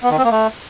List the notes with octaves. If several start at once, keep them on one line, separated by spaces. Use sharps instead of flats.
B3
D#3
C4
A#3
A3